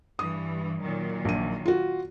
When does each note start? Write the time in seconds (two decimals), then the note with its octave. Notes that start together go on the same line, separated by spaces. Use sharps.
0.19 G2 E3 D#6
0.80 A#2 D#3 F#3
1.25 A#1 D#7
1.66 F4 F#4